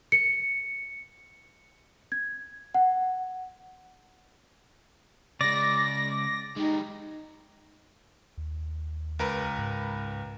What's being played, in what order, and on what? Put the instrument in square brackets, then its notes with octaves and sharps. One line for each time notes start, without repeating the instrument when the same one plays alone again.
[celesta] C#7
G#6
F#5
[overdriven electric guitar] C#3 G#3 [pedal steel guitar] D5 [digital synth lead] A#6
[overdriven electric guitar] G#3 G4 [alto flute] D#4
[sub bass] D#2
[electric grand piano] C#2 A#4 B4
[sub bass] G#2